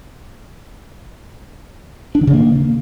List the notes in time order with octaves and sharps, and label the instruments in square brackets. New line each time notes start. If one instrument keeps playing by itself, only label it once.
[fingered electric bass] D4
D#3
C#3
A#3